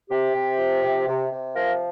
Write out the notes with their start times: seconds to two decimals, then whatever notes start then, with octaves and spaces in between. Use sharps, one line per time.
0.10 C3 G4
0.34 C3
0.59 F3
0.83 C3
1.07 C3
1.31 C3
1.55 F3 F4 A#4